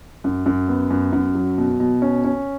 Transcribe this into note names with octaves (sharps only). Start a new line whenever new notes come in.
F#2
F#2
B3
F#2
F#2
F#3
B2
B2
C#4
C#4